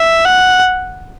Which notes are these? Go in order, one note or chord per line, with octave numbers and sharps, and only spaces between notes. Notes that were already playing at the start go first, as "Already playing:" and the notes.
Already playing: E5
F#5